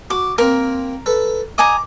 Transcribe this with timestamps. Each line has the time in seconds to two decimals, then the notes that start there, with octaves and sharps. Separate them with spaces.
0.10 F#4 D6
0.38 A#3 C4 A#4
1.06 A4 B4
1.58 D#5 G#5 A#5 D6